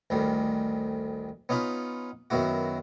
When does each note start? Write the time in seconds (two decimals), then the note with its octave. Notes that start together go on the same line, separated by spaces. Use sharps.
0.10 A1 D2 D#3 G3
1.49 B3 C#4 D#4 F4 B5
2.30 F#2 D#3 B3 E4 F#4